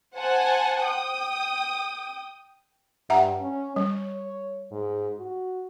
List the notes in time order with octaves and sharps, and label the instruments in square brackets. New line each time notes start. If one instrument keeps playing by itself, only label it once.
[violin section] C5 F#5 G#5 A5
G5 D#6
[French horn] G2 [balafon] E5 F#5 A#5
[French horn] C#4
[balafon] G3 [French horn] C#5
[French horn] G#2
F#4